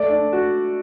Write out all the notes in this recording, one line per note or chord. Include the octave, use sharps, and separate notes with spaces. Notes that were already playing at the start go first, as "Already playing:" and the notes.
Already playing: A3 D5
D4
F#4